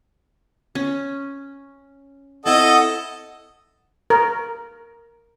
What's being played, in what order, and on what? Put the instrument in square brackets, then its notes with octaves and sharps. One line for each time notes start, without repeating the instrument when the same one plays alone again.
[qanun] C#4
[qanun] C4 E4 [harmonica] A4 D#5 [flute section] F#5 D#6
[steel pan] A#4